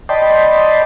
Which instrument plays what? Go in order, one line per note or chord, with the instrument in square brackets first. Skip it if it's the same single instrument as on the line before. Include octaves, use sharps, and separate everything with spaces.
[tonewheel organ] D5 D#5 G5 A5 B5 C6